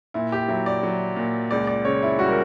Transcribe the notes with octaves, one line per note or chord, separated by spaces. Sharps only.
A#2 E4
G4
F#3 E4
D5
F#3
A#2
C#2 D5
D5
C#3 C#5
E4
G3 F#4
A#4